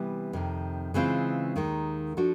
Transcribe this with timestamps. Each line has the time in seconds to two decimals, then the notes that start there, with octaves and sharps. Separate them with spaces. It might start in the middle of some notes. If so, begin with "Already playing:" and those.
Already playing: C3 E3 G3 B3
0.33 F2 C3 D#3
0.94 C#3 E3 G#3 C4 F4
1.56 D#2 D#3 G#3
2.17 F3 A3 D4 F#4